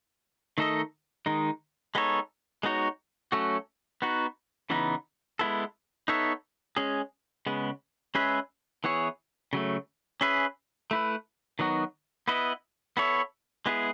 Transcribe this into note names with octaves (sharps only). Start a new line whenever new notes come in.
D#3 A3 D#4 A4 D#5
D#3 G#3 D#4
G#3 B3 D#4 A4 C#5
G#3 B3 D#4 F#4 C#5
F#3 A3 C#4 F#4 A4
B3 D#4 F#4
C#3 E3 B3 D#4
G#3 B3 E4 A4
B3 D#4 A4 C#5 E5
G#3 C#4 G#4
C#3 G#3 B3
G#3 C#4 G#4 B4 E5
E3 B3 E4 G#4 C#5
C#3 F#3 A3
C#4 G#4 B4 E5
A3 E4 B4
D#3 F#3 B3 D#4 F#4
B3 E4 B4 D#5
B3 E4 A4 C#5 E5
G#3 B3 E4 G#4